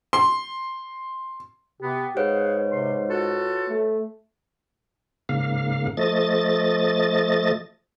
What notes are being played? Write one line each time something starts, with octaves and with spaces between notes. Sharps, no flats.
C6
C3 B3 G4
G#2 G#4 B4 C#5 F5 F#5
C3 C6
F4 F#4 A4
A3
G#2 C#3 A#3 F5
F3 A3 D#5 A6